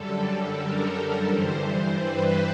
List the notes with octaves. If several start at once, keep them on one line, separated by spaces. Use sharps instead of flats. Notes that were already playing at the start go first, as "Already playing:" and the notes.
Already playing: F#2 D3 G3 A4
A#4
G2 E3 G3 C5
B4